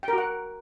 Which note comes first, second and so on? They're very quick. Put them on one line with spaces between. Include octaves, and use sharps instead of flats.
G5 A#4 F#4 F#5